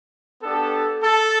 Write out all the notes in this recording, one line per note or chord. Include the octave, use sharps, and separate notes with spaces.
B3 D4 G4 A4
A4